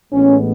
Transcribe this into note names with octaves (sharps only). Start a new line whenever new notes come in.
A1 A2 G#3 B3 C#4